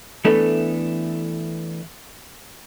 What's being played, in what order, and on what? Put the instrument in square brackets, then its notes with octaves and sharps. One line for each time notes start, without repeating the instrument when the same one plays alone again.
[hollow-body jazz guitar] E3 A3 B3 D4 A4